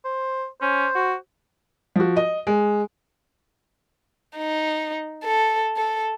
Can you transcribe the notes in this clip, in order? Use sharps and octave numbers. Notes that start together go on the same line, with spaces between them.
C5
C#4 C5
F#4
F3 F#4
D#5
G#3
D#4
A4
A4